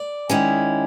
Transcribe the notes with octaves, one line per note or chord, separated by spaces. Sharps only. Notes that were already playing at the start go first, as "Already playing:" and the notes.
Already playing: D5
D#3 G#3 C#4 E4